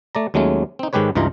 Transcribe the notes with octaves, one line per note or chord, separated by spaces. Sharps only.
A3 D5 A#5
D#2 F#3 G#3 A3 C#4
C4 D#4
G#2 D#3 G#3 G4 B4 C#5
C#2 G2 E3 D#4 F4 A#5